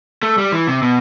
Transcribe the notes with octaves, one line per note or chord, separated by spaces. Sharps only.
A3
G3
E3
C3
B2